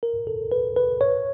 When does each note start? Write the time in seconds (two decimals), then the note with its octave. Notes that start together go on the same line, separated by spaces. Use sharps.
0.03 A#4
0.27 A4
0.52 B4
0.77 B4
1.01 C#5